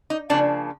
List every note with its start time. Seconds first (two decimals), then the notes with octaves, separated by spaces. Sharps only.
0.10 D#4
0.30 C#3 F3 A#3 D4